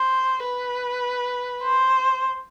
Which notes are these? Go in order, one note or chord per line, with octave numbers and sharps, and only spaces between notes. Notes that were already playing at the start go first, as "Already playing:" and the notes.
Already playing: C5
B4
C5